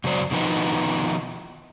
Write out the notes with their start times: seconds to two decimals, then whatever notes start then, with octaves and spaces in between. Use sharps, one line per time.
0.04 F#2 C#3 F#3 C5 D5
0.31 B2 D#3 F3 B3 D#4